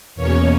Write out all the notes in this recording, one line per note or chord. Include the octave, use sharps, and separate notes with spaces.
E2 B2 A#3 C#4 C#5